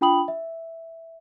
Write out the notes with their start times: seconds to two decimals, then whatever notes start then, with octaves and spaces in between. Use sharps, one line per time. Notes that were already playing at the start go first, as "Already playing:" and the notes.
0.01 D4 F4 G5 B5 D#6 F#7
0.28 E5